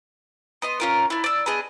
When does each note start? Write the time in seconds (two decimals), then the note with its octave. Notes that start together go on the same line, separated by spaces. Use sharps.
0.62 B3 D#5 C6
0.80 C#4 F4 A#4
1.10 D4 E4
1.24 D5 E6
1.46 B3 D4 G#4 D#5